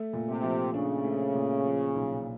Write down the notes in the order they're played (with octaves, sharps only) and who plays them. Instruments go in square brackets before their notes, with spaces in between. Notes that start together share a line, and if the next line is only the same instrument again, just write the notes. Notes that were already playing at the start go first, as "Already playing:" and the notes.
Already playing: [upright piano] A3
A#2
[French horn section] C3
[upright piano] F3
[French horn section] C#3 [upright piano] D4
[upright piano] A3
A#2
F3
B1